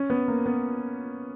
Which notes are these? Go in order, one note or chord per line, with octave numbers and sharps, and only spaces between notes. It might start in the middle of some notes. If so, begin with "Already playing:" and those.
Already playing: C#4
B3
A#3
B3